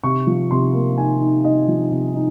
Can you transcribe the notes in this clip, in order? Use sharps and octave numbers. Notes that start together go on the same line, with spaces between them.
C3 C#6
F3
C3 C6
A#3
D#4 G#5
D#4
D#4 D#5
F3
C3
D#4